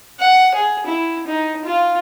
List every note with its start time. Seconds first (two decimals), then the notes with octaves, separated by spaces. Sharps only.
0.19 F#5
0.55 G#4
0.86 E4
1.27 D#4
1.65 F4